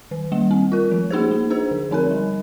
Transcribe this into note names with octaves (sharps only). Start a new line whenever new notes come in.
D#3
G3 A#3
C4
F4 A#4
F3
A#3 D#4 G#4 C5
A#3
D4 G#4 C5
D3
F3 C4 D#4 A#4
G3